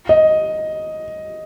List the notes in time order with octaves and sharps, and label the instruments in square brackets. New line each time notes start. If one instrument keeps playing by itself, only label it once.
[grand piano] D#5